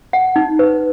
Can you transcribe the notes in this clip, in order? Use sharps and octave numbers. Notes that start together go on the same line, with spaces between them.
F#5
D#4
B4